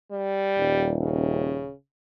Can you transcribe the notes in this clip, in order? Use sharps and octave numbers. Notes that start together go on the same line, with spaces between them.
G3
D#1
C#3